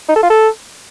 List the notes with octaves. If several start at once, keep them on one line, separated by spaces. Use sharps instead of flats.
D#4
A4
F4
A4